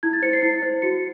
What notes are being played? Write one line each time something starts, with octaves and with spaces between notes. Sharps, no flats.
E4 G#6
A6
C5 C#7
C7
E4 A6
C5
F#4 C#7